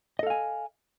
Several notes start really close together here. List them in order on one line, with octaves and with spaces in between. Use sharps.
D#5 A4 F5 G#5